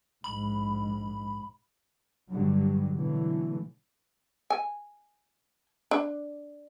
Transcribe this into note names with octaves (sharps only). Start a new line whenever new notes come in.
A#1 G#2 B5
G2 D3 F#3 G3
B2 D3 E3 F#3 A3
G#5
D4